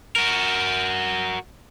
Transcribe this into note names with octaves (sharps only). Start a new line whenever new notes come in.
F#4 A#4